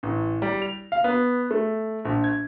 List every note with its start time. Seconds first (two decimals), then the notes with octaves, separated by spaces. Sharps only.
0.03 A1
0.42 G3
0.62 F7
0.92 F5
1.04 B3
1.51 A3
2.05 A#1
2.24 G#6